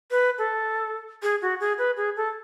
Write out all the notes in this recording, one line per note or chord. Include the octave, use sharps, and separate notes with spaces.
B4
A4
G#4
F#4
G#4
B4
G#4
A4